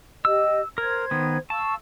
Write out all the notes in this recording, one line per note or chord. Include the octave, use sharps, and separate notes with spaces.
G4 D#5 E6
A#4 C5 G#6
D#3 B3
F5 A5 C#6 E6